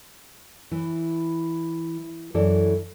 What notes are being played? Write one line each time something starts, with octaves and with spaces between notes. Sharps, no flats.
E3
F#2 E3 A4 D5